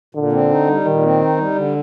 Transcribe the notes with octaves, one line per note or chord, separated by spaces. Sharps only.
A#2 D3
C4
D#4
G3
A#2 D#3
C4
D#4
G3
D3